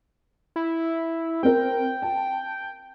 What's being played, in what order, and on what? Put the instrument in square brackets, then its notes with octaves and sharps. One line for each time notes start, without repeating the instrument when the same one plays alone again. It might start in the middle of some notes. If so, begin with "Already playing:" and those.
[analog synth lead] E4
[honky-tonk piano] C4 A#4 [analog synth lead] G5
[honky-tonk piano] A5